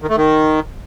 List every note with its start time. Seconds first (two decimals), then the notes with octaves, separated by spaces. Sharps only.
0.02 D#3
0.09 A3
0.17 D#3